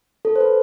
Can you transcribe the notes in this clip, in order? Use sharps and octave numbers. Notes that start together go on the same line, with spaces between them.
A4
C5
B4